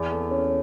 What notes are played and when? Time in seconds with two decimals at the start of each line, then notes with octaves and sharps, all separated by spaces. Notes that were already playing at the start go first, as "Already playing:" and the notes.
Already playing: E2
0.11 A4
0.31 C#4